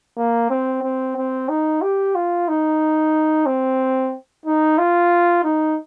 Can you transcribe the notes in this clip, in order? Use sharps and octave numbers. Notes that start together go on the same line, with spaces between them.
A#3
C4
C4
C4
D#4
G4
F4
D#4
C4
D#4
F4
D#4